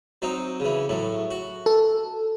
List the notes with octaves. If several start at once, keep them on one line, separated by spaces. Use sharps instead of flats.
F#3 C4 D#4
C#3 E3
A2 F#3
F#4
A4